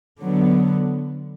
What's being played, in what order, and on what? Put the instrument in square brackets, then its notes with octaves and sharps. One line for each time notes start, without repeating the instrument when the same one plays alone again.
[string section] D3 F#3 B3